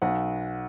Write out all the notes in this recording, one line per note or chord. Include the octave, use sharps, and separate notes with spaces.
B1 F#5